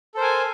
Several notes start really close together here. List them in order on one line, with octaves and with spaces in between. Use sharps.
A4 C5 A#4 G#5